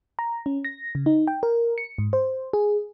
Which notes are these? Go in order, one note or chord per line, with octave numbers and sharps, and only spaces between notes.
A#5
C#4
A#6
C#3
D#4
G5
A#4
C#7
G#2
C5
G#4